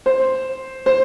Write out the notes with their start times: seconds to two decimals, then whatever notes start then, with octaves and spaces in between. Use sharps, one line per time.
0.06 C5
0.86 C5